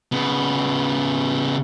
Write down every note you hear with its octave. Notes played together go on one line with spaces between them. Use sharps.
C#3 B3